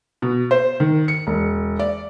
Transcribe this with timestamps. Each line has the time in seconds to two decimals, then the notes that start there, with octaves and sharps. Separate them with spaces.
0.22 B2
0.51 C5
0.80 D#3
1.08 C#7
1.27 E1
1.79 D5